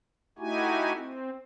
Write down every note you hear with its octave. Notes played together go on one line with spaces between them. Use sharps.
A3 D#4 E4 F#4 G4 G#5
C4